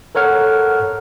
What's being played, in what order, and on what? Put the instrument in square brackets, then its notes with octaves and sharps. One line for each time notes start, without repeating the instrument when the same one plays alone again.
[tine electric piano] A4 A#4 C#5 F#5 F6